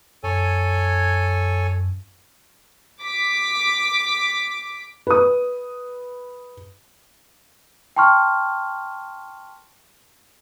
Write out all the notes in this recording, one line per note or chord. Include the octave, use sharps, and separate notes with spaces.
F#2 A4 C#5 G#5
D6 B6
B4 D#6
G5 A5 C6 C#6 F6